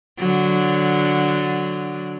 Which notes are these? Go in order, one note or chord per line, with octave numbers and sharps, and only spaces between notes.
D3 F#3